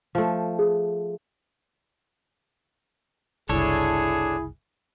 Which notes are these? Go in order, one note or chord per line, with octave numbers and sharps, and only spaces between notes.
F3 A3
G#4
F#1 C2 D4 E4 G#4 A4 C#5